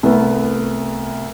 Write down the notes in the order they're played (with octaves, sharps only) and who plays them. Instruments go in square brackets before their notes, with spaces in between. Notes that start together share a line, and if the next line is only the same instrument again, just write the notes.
[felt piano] C2 A3 B3